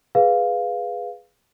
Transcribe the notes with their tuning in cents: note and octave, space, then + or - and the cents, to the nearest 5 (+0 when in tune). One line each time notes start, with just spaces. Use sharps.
G#4 +0 B4 +0 F5 +0